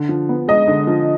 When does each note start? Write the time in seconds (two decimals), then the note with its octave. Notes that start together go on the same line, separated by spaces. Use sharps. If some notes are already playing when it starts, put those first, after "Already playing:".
Already playing: D3
0.09 F3
0.29 B3
0.48 G#3 D#5
0.67 D3
0.87 F3